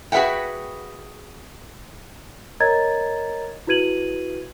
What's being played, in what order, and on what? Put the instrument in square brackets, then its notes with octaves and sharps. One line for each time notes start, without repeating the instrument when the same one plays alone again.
[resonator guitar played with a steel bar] F#4 G#4 B4 E5 F#5 G5
[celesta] A#4 C#5 D#5 A#5 G#6 A6
E4 F#4 B4 G#6 D#7 F#7